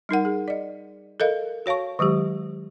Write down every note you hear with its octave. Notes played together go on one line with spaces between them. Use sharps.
G3 D#4 A#4 F#5
G#4
D5 D#5
A4 A#4 D#5 F5
F#4 C#5 F5 A5 C#6
D#3 F#3 G#3 G4